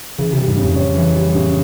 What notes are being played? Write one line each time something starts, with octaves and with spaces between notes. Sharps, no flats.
C#3 E3
C3
G3
G#2
C#3
F2
C#4
E3
G3
C#3